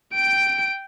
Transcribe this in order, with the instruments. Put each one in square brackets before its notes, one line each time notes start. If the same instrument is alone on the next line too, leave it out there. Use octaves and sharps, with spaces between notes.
[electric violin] G5 D7